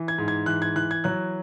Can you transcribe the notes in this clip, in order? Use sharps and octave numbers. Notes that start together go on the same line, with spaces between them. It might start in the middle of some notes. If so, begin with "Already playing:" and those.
Already playing: E3
G#6
G#2
G#6
E3 F#6
G#6
E3 F#6
G#6
F#3 F#6